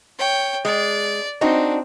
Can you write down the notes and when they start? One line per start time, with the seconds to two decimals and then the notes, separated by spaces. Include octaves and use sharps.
0.18 C#5 G5
0.65 G#3 D5
1.41 C4 D4 D#4 F#4